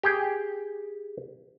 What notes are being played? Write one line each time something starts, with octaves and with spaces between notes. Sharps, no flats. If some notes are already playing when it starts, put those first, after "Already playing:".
G4 G#4 G5